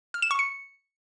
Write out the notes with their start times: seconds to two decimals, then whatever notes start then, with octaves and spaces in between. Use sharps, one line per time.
0.14 F6
0.22 E7
0.31 C#6
0.39 C#7